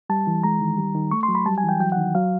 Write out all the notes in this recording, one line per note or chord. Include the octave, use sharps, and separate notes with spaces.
G3 A5
E3
G#3 A#5
D#3
G3
D#3
A3 C#6
C6
F#3
B5
G3 A5
G#5
E3 G5
F#3 G5
F#5
D#3
F#3 F5